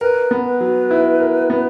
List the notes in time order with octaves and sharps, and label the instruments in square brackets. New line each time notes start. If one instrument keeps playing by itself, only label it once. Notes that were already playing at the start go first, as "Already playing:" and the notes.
[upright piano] A#4 [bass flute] B4
[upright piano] B3
[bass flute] B4
[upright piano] F#3
E4
A#4
B3